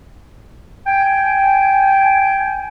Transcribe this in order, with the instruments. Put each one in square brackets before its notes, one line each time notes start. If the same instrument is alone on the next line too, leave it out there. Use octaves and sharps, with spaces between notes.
[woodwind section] G5 G#5